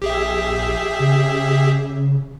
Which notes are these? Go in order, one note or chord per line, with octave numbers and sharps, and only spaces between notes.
A#1 G4 G#4 E5
C#3